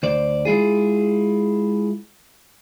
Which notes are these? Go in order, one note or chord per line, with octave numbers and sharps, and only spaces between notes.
D2 C5 D5
G#3 E4 F4 G#4